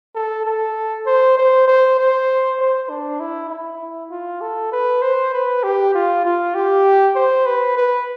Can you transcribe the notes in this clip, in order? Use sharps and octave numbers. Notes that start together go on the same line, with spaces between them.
A4
A4
C5
C5
C5
C5
C5
D4
E4
E4
F4
A4
B4
C5
B4
G4
F4
F4
G4
C5
B4
B4